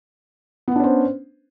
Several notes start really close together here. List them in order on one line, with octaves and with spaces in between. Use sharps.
B3 B4 D4 C#4 C5